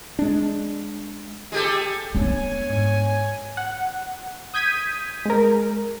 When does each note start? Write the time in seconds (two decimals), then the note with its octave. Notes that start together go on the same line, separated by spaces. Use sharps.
0.19 G#3 D4
1.52 G#3 G4 A4
2.15 B3 D4 C#5 G#5
2.70 G#2
3.57 F#5
4.54 D#6 G6 G#6 B6 D#7
5.25 G#3 A#4